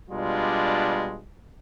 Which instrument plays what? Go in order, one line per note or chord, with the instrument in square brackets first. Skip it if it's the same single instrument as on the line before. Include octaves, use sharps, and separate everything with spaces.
[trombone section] B2 G3 G#3 D4 F4